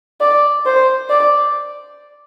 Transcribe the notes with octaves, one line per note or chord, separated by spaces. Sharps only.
D5
C5
D5